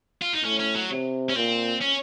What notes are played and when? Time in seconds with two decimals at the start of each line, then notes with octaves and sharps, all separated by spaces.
0.21 F4
0.33 D#4
0.44 A2 C#4
0.59 C#4
0.75 F#3
0.90 C3
1.30 C#4
1.36 A#2 C4
1.81 C#4